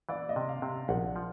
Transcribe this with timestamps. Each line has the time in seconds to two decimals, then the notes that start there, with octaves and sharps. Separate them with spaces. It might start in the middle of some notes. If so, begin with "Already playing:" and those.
0.09 E3 D5
0.29 D#5
0.36 C3
0.49 F5
0.62 C3
0.69 F5
0.88 A#1 F#5
1.16 F3